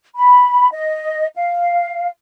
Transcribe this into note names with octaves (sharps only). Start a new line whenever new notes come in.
B5
D#5
F5